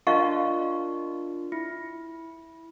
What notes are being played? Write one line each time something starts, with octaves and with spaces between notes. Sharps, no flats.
D4 F4 A#4 D#5 F5 C#6
E4